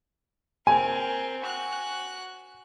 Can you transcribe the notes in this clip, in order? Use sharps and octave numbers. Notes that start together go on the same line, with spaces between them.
C4 A#4 G#5
F#4 F#6